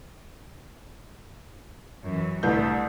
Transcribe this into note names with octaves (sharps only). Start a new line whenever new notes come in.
F#2 E3
C2 D3 A3 B4 G6